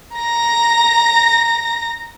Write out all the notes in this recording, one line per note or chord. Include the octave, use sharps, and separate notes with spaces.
A#5 A#6